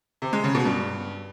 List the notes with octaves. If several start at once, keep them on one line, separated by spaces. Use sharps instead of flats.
C3
G#3
C#3
B2
G2